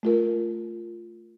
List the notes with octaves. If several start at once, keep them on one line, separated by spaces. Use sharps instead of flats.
A3 F4 A#4